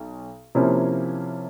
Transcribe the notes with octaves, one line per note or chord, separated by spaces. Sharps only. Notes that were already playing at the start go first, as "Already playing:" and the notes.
Already playing: B1
C3 F3 A#3 C#4 E4